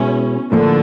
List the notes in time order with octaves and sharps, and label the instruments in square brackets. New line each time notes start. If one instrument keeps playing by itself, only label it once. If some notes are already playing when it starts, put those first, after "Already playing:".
Already playing: [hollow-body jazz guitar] B2 G#3 B3 E4 [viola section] C#4
[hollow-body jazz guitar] A2 F3 A#3 [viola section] D3 D4